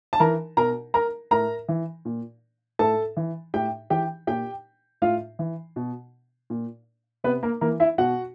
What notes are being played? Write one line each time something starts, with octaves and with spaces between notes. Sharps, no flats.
A5
E3 A#4 A#5
B2 A#4 A#5
A#4 A#5
A2 A#4 A#5
E3
A#2
A2 A4 A5
E3
A2 G4 G5
E3 G4 G5
A#2 G4 G5
A2 F4 F5
E3
B2
A#2
C3 B3 B4
A#3 A#4
E3 A#3 A#4
E4 E5
B2 F#4 F#5